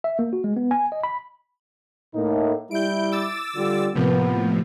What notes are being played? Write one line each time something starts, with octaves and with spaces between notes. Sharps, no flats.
E5
A#3
F#4
G#3
B3
G#5
D#5
B5
A2 A#3 D#4
G3 E4 G6 D7
D6 E6 A6
D3 G3 F4
A2 C3 F3 A#3 B3